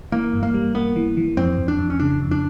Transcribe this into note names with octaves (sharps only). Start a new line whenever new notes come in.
E3 A#3
G2
A#3
G3
A#3 B3
E3
E3
F2 C4
F2
D4
F2
C#4
C#3 D4
F2
D4